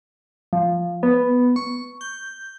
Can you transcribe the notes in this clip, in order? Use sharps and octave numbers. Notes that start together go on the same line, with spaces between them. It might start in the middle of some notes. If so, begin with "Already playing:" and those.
F3
B3
C#6
G6